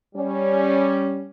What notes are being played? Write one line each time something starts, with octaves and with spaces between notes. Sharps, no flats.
G3 C#4